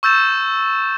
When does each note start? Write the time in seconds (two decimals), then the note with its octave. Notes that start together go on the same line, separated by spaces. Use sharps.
0.03 C#6 E6 G6 A6 E7